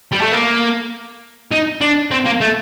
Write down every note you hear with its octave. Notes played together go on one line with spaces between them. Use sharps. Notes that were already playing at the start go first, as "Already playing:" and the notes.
G3
A3
A#3
D#4
D4
C4
A#3
A3